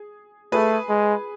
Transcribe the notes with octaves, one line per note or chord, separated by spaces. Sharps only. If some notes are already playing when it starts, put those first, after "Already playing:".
Already playing: G#4
A3 G#4 B4
G#3